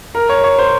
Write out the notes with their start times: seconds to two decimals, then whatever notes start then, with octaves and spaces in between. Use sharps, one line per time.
0.15 A#4
0.29 C#5
0.44 C#5
0.59 C5